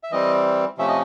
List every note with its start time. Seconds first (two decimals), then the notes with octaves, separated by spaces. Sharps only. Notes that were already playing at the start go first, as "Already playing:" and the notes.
0.03 E5
0.11 E3 G3 C4 D#5
0.78 C3 F3 A3 C#4 E5
0.88 D#5